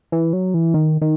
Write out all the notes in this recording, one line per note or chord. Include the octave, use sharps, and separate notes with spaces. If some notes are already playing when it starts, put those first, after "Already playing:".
E3
F#3
E3
D#3
D#3